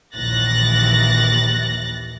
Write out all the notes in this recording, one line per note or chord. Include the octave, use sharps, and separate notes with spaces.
A#1 D#2 E3 F#6 A6 A#6